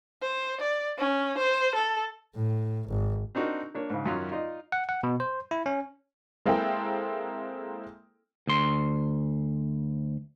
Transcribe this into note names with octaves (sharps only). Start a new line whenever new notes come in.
C5
D5
C#4
C5
A4
A2
G#1
C4 D4 D#4 F#4 A#4
A#3 D4 C#5
G#2 C#3
F#2 D#3 F#3 C#4 F4
D#4 F4 D5 D#5
F#5
F#5
B2
C5
E4
C#4
G#3 A#3 C4 E4 A4 G5
D2 C6